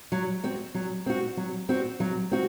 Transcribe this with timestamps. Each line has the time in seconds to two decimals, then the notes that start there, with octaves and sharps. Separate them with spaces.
0.12 F#3
0.44 C4 F#4
0.75 F#3
1.06 C4 F#4
1.37 F#3
1.69 C4 F#4
2.00 F#3
2.31 C4 F#4